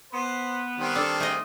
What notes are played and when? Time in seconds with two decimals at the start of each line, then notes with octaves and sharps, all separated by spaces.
0.13 B3 C5
0.78 D#3 G3 C4
0.96 D4 A4
1.20 G#2 A3 G#4 D#5